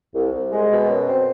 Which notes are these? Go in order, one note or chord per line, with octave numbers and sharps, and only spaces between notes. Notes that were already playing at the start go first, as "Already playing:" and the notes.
C2
C2
G#3
B2
F#2
C4